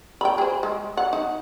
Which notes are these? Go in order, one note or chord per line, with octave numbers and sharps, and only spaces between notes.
G5 B5
G#4 C5
G#3
F#5
D#4